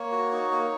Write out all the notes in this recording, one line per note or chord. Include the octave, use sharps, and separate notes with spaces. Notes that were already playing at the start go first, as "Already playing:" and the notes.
Already playing: A#3 C#5
F#4
D#4
A#3